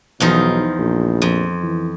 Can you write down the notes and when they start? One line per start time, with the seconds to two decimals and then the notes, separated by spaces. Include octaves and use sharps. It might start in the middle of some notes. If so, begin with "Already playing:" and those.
0.20 B1 E2 F3 D#4
0.79 A#1
1.22 F2
1.63 E3